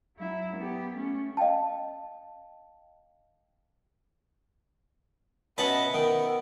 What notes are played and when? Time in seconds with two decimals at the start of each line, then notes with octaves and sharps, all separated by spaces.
0.16 F#3 E4
0.57 B3 G4
0.96 A3 C#4
1.37 D#5 F5 G5 A5
5.58 B2 C#4 B4 D#5 E5 F#5 A5 B5
5.94 D#3 B3 A#4